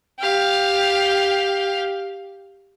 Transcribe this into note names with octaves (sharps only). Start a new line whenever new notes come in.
G4 F5